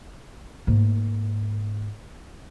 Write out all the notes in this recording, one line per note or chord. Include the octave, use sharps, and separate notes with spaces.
G#2 A#3